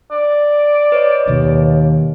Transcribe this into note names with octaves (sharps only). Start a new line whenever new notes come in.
D5
B4 C#5 D#5
D#2 B2 D#3